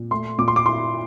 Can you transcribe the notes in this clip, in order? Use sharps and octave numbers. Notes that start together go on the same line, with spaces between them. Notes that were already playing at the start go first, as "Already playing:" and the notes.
Already playing: A#2
A3 C6
A#2 D6
C6
D6
E4 C6